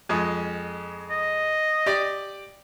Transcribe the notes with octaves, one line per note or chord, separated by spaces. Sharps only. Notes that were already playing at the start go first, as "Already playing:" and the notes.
F2 G#3
D#5
G4 D5